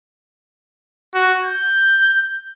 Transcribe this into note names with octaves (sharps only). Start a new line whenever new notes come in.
F#4
G6